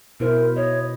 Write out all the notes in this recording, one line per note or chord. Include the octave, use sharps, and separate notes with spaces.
B2 E4 A#4 C5
C#5 D#5